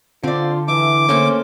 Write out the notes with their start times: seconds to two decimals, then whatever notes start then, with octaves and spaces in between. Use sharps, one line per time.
0.23 D3 C4 F4 D5
0.68 E3 E5 D6
1.09 A3 A#3 C#4 C5